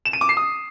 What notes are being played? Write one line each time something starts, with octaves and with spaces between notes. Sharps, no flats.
E7
D#7
D6
C7
D#6